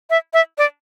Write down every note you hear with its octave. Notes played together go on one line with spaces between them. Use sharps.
E5
E5
D5